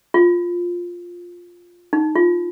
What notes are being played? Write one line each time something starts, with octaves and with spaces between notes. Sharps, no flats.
F4
D#4
F4